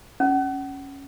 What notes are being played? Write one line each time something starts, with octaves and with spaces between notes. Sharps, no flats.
C#4